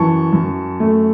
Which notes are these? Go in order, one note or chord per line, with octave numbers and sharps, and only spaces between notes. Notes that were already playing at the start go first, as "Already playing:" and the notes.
Already playing: F#2 E3 A5 C#6
F#2
A3